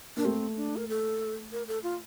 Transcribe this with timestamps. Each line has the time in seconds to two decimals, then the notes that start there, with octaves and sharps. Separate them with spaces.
0.17 A#3 D4
0.25 A3 C4
0.56 D4
0.77 A#4
0.89 A4
1.52 A#4
1.68 A4
1.83 F4